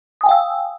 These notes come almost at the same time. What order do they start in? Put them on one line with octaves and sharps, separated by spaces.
D#6 G#5 G5 F5 E6